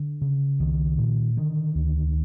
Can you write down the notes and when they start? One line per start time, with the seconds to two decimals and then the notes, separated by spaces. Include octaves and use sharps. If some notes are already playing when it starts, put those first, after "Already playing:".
Already playing: D3
0.21 C#3
0.59 C2 D#3
0.99 A#2
1.37 D3 D#3
1.75 D2